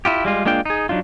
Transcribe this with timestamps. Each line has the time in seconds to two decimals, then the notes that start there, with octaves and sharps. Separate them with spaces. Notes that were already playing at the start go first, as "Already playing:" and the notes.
0.05 E4 F4 G4
0.25 G3 G#3 F4
0.45 G#3 A#3 D4 F4 G5
0.65 D#4 G#4
0.89 F#3 D4 D#4 F4